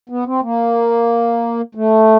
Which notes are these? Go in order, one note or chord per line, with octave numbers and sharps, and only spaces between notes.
B3
C4
A#3
A3